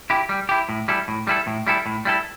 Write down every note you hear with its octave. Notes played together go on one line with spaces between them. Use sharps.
E4 G4
G3
E4 G4
A2
G3 E4 A4
A2
G3 E4 A4
A2
G3 E4 A4
A2
G3 E4 A4